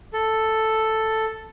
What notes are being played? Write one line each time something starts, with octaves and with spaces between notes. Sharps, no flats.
A4